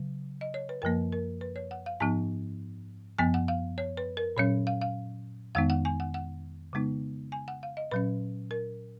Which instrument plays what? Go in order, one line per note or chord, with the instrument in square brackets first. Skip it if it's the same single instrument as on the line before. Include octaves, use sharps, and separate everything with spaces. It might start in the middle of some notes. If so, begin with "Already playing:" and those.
Already playing: [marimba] C#3 F#3
D#5
C#5
B4
F#2 F3 A#3 A#4
A#4
B4
C#5
F#5
F5
G#2 F3 B3 D#4 G#5
F#2 F3 B3 G#5
F#5
F5
C#5
B4
A#4
A#2 F#3 C#4 C#5
F5
F5
F2 D#3 G#3 B3 D#4 F5
F#5
G#5
F#5
F#5
C#3 G#3 B3 D#4
G#5
F#5
F5
D#5
A#2 F#3 C#4 B4
A#4